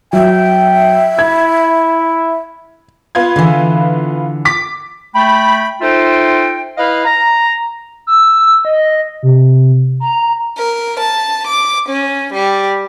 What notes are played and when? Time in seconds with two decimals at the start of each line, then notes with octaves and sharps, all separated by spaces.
0.13 F#3 E5 G5
1.19 E4 G#6
3.15 B3 F4 G#6
3.36 D3 E3
4.45 D6 B6
5.14 A3 G5 B5
5.81 D#4 F4 A4 C5 E5 G5
6.77 E4 B4 D#5 F5
7.04 A#5
8.07 E6
8.65 D#5
9.23 C3
10.00 A#5
10.57 A#4
10.99 A5
11.47 D6
11.89 C#4
12.33 G3